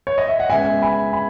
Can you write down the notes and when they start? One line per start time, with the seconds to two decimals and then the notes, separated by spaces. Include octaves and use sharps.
0.07 C#5
0.18 D#5
0.28 E5
0.40 F#5
0.50 C#2 C#3 G#3 B3 E5 G#5
0.82 G#5 B5
1.13 G#5 B5